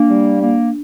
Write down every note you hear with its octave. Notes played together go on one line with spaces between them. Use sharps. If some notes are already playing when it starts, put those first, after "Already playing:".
Already playing: A#3 D4
G3
A#3